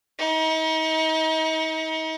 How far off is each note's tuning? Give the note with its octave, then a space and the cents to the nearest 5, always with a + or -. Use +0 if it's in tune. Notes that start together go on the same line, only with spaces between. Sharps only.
D#4 +35